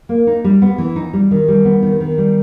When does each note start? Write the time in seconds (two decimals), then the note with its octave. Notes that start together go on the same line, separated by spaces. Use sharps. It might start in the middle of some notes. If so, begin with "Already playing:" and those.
0.09 A#3
0.27 D#4
0.44 G3
0.62 B3
0.78 E3
0.96 D#4
1.13 G3
1.31 D#3
1.48 G3
1.65 B3
1.83 D#3
2.00 D#3
2.18 G3